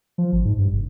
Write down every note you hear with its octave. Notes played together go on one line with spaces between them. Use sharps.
F3
G#1
G#2
G2
F1